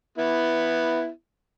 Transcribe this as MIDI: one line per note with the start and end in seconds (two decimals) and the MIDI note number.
0.18 1.09 59
0.18 1.09 64